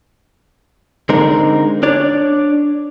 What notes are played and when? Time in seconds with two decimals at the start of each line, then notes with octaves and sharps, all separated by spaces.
1.09 D3 G#3 C4 D#4 A#4
1.83 D4 C#5 D5